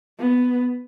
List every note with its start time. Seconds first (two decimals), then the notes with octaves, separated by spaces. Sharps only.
0.19 B3